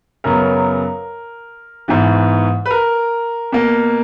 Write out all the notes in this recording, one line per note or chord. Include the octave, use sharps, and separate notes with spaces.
F#2 C#3 F#3 B3 A#4
G#2 E3 B3
B4
A#4
B2 A#3